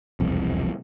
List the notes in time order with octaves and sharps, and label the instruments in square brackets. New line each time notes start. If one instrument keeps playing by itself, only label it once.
[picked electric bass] E1 C2 F2